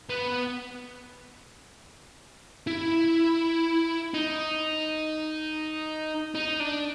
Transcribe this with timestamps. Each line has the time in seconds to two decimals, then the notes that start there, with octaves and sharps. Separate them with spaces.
0.09 B3
2.67 E4
4.14 D#4
6.35 D#4
6.60 D4